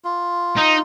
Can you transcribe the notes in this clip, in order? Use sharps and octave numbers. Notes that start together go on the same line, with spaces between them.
F4
D#4